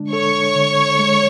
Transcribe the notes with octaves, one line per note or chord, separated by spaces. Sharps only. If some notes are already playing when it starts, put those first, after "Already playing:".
Already playing: D3 G#3 D4
A4 C#5 C#6
D3
G#3